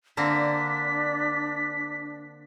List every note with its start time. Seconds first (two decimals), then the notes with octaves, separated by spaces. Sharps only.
0.17 D3 A#3 C4 D4 B6